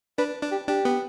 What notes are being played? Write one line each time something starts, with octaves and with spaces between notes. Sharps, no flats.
D4 B4
D4
G4
D4 G4
B3